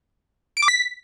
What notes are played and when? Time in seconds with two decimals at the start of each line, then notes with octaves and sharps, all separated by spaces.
0.57 D7
0.62 D6
0.68 B6